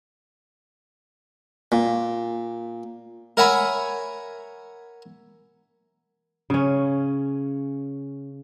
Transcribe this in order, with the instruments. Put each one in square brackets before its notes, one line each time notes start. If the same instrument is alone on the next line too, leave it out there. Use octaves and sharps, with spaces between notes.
[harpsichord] A#2
A#4 C#5 E5 F#5 G#5 B5
[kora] C#3 C#4